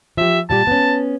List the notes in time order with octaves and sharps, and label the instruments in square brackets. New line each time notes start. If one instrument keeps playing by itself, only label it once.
[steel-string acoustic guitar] F3 G4 [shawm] E5
[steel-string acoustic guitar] A#2 G3 G4 [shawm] A5
[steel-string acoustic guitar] B3 C#4